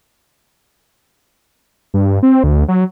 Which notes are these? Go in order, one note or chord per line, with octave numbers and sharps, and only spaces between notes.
G2
C4
D2
F#3